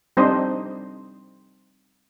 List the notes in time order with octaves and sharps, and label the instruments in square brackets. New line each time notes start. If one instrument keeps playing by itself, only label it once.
[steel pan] G3 C4 D4 D#4 C5 D#5